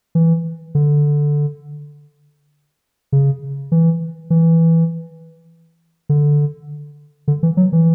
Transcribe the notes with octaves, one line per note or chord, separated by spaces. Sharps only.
E3
D3
C#3
E3
E3
D3
D3
E3
F#3
E3